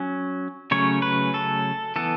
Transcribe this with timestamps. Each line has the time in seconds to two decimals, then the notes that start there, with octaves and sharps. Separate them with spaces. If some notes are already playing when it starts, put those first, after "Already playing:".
Already playing: F#3 C#4
0.71 C#3 F#3 A3 C#4 C#5
1.02 B4
1.34 A4
1.96 E3 B3 A4